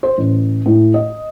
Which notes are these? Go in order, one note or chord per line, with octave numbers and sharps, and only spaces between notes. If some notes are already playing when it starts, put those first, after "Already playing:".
C5
A1
A2
D#5